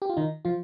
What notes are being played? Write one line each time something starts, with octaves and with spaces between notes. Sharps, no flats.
G4
F4
D#3 D#4
F3 F4